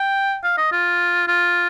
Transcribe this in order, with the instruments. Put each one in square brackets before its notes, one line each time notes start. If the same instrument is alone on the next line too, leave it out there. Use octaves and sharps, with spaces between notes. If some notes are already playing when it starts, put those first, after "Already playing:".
Already playing: [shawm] G5
F5
D#5
F4
F4